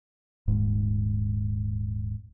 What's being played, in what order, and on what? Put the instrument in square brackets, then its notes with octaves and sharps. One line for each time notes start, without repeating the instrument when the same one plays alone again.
[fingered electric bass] D#1 G#2